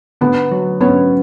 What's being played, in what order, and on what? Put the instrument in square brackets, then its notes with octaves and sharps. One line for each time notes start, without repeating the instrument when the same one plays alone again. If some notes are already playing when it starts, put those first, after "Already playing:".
[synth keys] D3 [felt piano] B3
[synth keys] F#3
[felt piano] B3 [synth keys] C#4